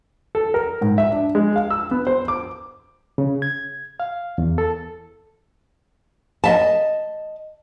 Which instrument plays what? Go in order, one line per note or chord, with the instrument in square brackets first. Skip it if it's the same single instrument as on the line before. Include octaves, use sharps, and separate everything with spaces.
[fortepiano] A4
A#4
G#2
E5
D4
G#3
F5
E6
B3
C5
D6
[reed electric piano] C#3
G#6
F5
E2
A4
[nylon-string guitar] D#5 E5 A5